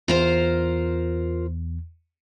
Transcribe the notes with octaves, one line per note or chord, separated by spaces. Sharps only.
E2 F4 A#4 C5